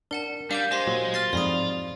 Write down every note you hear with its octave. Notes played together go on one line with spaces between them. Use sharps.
D4 A#4 F#5 A5
G3 D4 F5 D6 G6
G#3 G4 C5 C6
A#2 F#3
F4 F6 A6 C7
F2 G#2 D5 B5 D#6